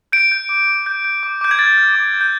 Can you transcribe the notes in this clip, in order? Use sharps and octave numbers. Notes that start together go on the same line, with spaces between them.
G6 D7
G6
D6
D6
G6
G6
D6
D6 G6
G#6
F6 A6
F6
D6
D6
G6